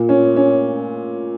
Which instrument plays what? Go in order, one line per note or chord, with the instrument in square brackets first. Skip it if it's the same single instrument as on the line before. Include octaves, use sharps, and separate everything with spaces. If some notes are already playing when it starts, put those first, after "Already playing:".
Already playing: [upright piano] A#2
C#4
C#4